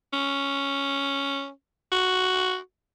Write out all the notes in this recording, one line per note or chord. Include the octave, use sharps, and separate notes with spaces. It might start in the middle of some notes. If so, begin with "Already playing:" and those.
C#4
F#4